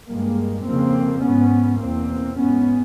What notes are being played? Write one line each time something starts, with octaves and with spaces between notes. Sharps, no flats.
G2 G#3 A#3
F2 C#3 A#3 C4
G#2 B3 C#4
E2 B2 A#3 C4
G#2 B3 C#4